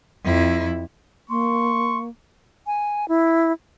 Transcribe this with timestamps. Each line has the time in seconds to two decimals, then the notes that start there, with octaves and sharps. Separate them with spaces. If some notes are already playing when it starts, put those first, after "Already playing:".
0.25 F2 E4
1.30 A#3 C6 C#6
2.66 G#5
3.08 E4